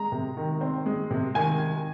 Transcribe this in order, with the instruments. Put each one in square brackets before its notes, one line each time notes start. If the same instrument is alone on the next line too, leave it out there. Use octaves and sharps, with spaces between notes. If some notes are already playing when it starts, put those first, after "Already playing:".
Already playing: [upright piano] G#3 A#5
C3
D#3
C4
G#3
C3
D#3 G#5
D#3